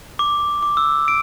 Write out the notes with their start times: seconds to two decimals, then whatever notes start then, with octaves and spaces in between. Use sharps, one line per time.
0.19 D6
0.63 D6
0.77 E6
1.08 D7